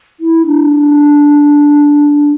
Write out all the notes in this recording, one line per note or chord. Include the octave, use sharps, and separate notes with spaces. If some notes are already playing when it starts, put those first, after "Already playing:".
E4
D4